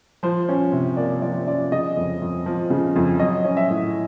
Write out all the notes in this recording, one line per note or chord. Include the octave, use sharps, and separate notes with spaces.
F3 C5
C#4
C3
A#3 D5
F3 D5
C#4 D5
C#3 D#5
F2
F2
F3
C#3
F2
F#3 D#5
C#4
E5
A2